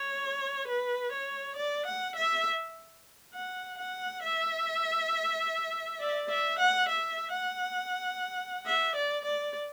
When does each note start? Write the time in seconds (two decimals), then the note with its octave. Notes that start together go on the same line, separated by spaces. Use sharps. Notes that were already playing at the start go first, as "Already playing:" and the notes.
Already playing: C#5
0.68 B4
1.12 C#5
1.56 D5
1.86 F#5
2.16 E5
3.34 F#5
3.78 F#5
4.23 E5
6.00 D5
6.30 E5
6.59 F#5
6.89 E5
7.33 F#5
8.66 E5
8.96 D5
9.25 D5